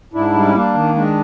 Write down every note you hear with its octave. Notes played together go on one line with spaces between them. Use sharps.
G#2 D4 E4
G3
C#4
A#3 D4
D#3
G#3 D4